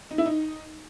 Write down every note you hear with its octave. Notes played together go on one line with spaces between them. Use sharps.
D#4
E4
D#4